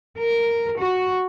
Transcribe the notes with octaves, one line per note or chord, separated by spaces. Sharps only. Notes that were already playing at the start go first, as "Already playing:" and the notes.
A#4
F#4